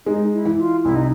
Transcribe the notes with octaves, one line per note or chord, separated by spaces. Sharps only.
G#3 D#4
E4
E3
F4
C2 E4
D#4